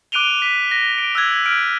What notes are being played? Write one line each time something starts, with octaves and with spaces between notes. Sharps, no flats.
D6 F#6 D7 D#7 F7 G7
B6
A#6
D7
E6 F#6 G#6
F6 D7